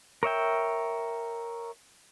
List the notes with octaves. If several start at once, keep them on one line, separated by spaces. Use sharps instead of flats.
A#4 C#5 E5 G5